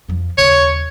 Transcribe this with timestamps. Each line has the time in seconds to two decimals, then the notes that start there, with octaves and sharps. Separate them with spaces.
0.08 F2 F3
0.38 D#2 C#3 C#5